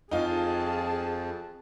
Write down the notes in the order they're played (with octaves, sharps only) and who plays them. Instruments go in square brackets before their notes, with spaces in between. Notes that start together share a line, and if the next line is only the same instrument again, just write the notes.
[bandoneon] F2 [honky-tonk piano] D#4 F4 [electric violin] G#4 A5